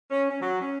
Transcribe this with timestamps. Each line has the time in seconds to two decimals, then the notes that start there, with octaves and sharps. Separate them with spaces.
0.09 C#4
0.29 C#4
0.40 F#3
0.61 C#4